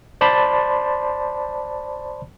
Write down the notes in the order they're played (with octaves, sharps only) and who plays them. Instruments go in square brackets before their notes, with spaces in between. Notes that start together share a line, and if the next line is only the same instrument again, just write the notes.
[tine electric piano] C5 D5 A5 B5 C6